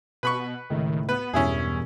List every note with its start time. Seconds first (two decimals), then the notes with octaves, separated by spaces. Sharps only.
0.23 B2 B4 B5 C#6
0.70 C#2 A2 D#3 E5
1.09 B3 B4
1.33 E1 E2 G2 C#4 E4 G#4